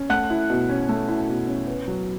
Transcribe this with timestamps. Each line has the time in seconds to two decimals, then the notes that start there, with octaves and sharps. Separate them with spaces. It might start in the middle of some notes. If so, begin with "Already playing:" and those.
Already playing: C#4
0.10 A3 F#5 F#6
0.30 E4
0.50 B2
0.69 C#4
0.89 A3
1.08 E4
1.28 B2
1.47 C#4
1.67 B3
1.88 F#3